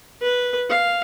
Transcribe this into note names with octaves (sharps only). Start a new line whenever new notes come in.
B4
F5